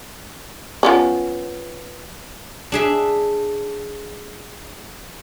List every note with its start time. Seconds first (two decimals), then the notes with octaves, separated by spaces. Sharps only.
0.83 F3 B3 C#4
2.72 D4 G#4 E5